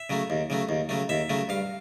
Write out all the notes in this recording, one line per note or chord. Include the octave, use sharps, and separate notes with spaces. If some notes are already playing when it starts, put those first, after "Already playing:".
Already playing: E5
C#3 F#3 A3
D#2
C#3 F#3 A3
D#2
C#3 F#3 A3
D#2 E5
C#3 F#3 A3
G2 F5